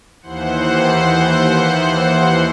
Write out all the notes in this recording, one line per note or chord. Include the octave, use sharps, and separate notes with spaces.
D#2 E3 C5 F#5